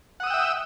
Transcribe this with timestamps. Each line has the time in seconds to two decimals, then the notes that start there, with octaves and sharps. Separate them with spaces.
0.20 F#5
0.23 D#6
0.27 E6
0.30 G5
0.34 E5